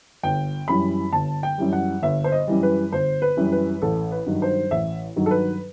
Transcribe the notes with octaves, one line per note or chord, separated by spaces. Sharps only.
G1 G5
F#2 E3 G3 B5
G1 A5
G5
F#2 E3 G3
F#5
G1 E5
C5
D#5
F#2 E3 G3
B4
G1 C5
B4
F#2 E3 G3
B4
A1 A4
B4
G2 D#3 F#3
C5
A1 E5
G2 D#3 F#3
A4
B4